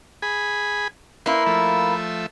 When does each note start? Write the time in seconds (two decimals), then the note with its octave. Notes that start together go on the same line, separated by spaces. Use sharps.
0.22 G#4 B5
1.26 A#3 E4 B4 C6
1.46 F3 A3 E5